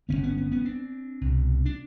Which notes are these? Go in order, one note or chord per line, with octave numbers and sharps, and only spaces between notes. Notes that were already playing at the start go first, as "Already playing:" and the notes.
G1 G2 D3 B3 C#4
B3 C#4
B3 C#4
B3 C#4
C4 D4
C2 B2
D4